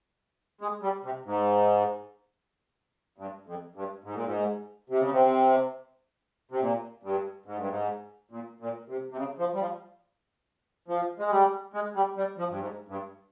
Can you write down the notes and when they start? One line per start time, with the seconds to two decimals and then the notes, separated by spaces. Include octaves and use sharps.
0.61 G#3
0.82 G3
1.04 C3
1.26 G#2
3.18 G2
3.46 F2
3.75 G2
4.04 G#2
4.14 A#2
4.25 G#2
4.90 C3
5.00 C#3
5.11 C3
6.51 C3
6.60 A#2
7.03 G2
7.46 G#2
7.57 G2
7.69 G#2
8.31 A#2
8.60 A#2
8.89 C3
9.12 C3
9.17 C#3
9.39 F3
9.54 G3
9.60 F3
10.88 F3
11.19 G#3
11.31 G3
11.74 G#3
11.95 G3
12.17 G3
12.38 F3
12.50 G2
12.59 G#2
12.88 G2